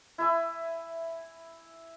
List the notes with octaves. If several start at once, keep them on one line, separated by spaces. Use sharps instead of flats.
E4 E5 G#5